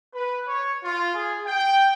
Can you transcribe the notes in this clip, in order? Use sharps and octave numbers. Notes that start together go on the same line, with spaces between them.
B4
C#5
F4
G#4
G5